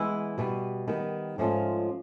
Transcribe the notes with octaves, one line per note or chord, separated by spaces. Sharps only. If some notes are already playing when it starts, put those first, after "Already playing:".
Already playing: E3 G#3 B3 E4
B2 G3 B3
D#3 G3 B3
G#2 F3 A3 C#4 F4